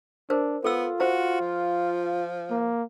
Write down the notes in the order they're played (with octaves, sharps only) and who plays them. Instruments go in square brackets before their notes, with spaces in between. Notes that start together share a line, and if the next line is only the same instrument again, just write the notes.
[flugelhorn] D4 [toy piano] A#4 C5
[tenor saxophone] B3 [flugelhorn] F4 [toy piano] A4 E6
[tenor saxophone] F#4 [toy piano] C5 A#5
[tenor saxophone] F3
[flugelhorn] A#3